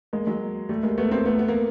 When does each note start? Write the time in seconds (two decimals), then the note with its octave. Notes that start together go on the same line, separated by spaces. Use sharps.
0.13 G#3 A#3
0.27 F#3 G#3
0.69 G3 A3
0.83 G#3 A#3
0.98 A3 B3
1.11 A#3 C4
1.25 A3 B3
1.39 B3
1.48 A#3